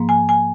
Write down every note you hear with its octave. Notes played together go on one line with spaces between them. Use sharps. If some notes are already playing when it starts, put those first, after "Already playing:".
Already playing: G#2 F3 A#3
G#5
G#5